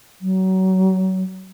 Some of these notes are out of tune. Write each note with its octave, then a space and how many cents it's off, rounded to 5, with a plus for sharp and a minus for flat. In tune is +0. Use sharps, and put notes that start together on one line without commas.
F#3 +25